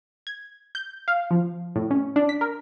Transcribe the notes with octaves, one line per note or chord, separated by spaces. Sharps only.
G#6
G6
F5
F3
A2
C#4
D4
B6
A#4